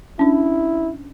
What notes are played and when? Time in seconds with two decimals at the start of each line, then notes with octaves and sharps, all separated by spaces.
0.19 C#4 D4 E4